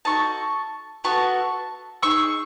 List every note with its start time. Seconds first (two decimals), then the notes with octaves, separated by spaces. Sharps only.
0.05 D#4 F#4 A4 A5 C#6
1.04 B3 F#4 A4 A5 C#6
2.03 D#4 G#4 C#6 E6